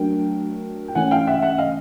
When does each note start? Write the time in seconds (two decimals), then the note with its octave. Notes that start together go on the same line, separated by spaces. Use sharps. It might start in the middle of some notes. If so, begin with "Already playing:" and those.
Already playing: F#3 A3 D4 F#4 A#4 G5
0.88 G5
0.95 E3 A3 C#4 F#5 G#5
1.11 F5 G5
1.27 E5 F#5
1.42 E5 F#5
1.58 D#5 F5